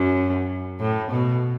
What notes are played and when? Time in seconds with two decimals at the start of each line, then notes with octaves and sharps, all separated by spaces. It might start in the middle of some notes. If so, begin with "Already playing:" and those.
Already playing: F#2
0.80 A2
1.11 B2